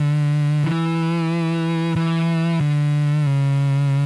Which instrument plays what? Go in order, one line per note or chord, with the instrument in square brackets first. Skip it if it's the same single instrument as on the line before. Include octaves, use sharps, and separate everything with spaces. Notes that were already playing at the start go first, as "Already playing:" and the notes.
Already playing: [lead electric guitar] D3
E3
E3
D3
C#3